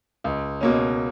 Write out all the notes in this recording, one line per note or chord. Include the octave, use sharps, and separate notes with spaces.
C#2
B2 A#3 C#4